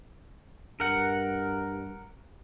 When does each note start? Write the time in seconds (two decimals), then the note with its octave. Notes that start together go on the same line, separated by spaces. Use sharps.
0.80 G2 A#4 F#5